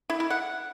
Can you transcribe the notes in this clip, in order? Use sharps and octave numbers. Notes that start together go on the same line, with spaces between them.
E4
E4
F#5